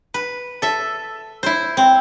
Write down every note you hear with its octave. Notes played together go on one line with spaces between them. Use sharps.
B4
A4 E5
E4 C5
C4